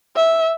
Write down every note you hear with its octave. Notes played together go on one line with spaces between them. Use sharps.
E5